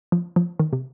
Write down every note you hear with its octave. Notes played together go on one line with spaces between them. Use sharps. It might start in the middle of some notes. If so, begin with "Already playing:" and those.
F3
F3
D#3
C3